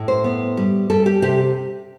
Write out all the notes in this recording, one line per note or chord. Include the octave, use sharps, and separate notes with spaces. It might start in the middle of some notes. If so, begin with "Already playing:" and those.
Already playing: A2
C5
B3
G3
G3 A4
G4
C3 G4